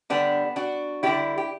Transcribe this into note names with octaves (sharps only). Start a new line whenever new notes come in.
D3 G3 B3 D4
D4 F#4
D3 G3 E4 G4
G4